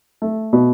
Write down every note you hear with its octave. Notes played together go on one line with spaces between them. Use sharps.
A3
B2